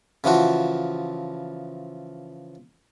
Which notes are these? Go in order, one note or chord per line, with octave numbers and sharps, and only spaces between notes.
C#3 E3 F3 F#4